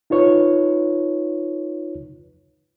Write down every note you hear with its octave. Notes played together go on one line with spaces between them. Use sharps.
D#4 F4 B4 C#5